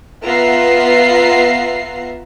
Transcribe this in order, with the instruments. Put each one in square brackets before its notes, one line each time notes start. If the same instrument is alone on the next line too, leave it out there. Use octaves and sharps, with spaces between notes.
[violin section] B3 F4 E5 F#5 A#5 C7